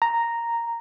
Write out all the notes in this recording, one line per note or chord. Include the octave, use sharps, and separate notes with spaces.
A#5